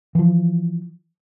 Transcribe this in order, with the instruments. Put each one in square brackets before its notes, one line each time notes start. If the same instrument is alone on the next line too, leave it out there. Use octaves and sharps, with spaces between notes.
[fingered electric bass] E3 F3